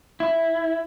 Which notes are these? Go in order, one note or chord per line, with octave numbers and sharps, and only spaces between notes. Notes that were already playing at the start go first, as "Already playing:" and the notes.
E4